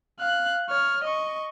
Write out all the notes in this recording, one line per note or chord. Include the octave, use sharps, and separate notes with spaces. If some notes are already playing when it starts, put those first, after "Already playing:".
F5 F#6
C#5 F6
D#5 C#6